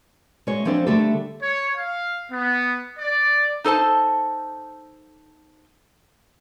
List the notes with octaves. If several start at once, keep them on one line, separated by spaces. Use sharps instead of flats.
G#3 F#4 C#5
F3 C4 D4 A4 B4 C5
D3 G3 A3 G4 A4
C#5
F5
B3
D5
D#4 A4 C5 A5